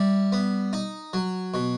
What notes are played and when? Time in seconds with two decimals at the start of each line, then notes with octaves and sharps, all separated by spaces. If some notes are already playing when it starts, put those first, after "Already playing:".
Already playing: G3 E4
0.32 B3
0.73 D#4
1.13 F#3
1.54 B2